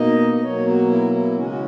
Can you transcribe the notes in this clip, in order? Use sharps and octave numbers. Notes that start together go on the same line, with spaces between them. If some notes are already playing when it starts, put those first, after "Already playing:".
Already playing: B2 A#3 D#4 D#5
D#5
B2 F#3 A#3 C#5
F#4
E4
E4
C#3 E3 G#3 C#4 F#4
F#4